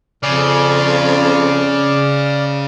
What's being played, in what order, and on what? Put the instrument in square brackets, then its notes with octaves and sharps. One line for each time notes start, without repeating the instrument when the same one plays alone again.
[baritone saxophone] F2 [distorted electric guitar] C#3 [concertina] D5 D6 F6